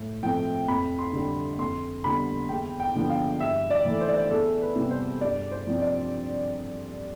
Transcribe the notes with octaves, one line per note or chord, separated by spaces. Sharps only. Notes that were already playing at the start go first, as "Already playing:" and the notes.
Already playing: A2
F3 A3 C4 G5
F2 B5
C6
D3 G3
F2 C6
D3 G3 B3 B5
E2 G5
G5
D3 F3 B3
F5
G2 E5
D5
E3 A3
C5
D5
C5
E2 A4
B4
C3 G3 B3
C5
G2 D5
C5
F3 C4
D5